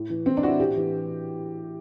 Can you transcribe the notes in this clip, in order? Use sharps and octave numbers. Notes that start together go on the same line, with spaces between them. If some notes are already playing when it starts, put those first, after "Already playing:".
Already playing: A2
E3
A2 C4
D4
E3 E4 F#4
A2 G4
E3